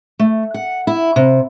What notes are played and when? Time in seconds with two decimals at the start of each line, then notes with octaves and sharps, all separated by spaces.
0.19 A3
0.54 F#5
0.87 E4
1.16 C3